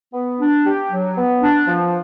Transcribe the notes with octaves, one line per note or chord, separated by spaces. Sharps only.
B3
D4
G4
F#3
B3
D4
F3